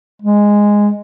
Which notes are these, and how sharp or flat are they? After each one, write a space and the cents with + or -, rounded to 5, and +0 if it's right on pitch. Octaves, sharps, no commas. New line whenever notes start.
G#3 -10